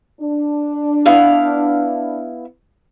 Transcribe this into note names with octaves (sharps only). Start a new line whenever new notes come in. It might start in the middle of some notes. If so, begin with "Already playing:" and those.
D4
B3 E4 F5